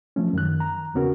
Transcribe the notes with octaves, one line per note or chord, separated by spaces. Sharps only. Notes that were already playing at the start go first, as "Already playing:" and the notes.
F3 A3 C#4
F#2 D#3 F#6
A#5
E2 C#3 B3 C#4 F#4 A#4